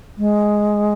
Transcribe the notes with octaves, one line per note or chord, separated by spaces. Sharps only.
G#3